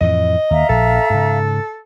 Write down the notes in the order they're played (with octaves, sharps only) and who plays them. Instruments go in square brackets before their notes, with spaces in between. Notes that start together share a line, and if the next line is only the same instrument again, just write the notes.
[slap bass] F2 A2 E3 [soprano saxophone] D#5
[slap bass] D#2 [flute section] E5 F5 A#5
[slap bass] A#1 [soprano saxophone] A4
[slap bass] G#2 C#3